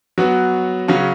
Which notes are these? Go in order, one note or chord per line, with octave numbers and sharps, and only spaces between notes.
F#3 B3 F#4
C#3 F#3 C#4 F#4